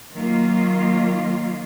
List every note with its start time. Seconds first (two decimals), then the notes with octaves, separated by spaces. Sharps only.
0.13 D#3 F#3 A#3 F4